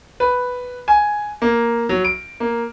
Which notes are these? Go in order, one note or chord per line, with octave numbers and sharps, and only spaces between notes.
B4
G#5
A#3
F#3
D7
A#3